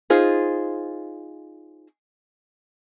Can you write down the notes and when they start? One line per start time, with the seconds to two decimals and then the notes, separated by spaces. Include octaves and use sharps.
0.10 D#4 F4 G#4 C5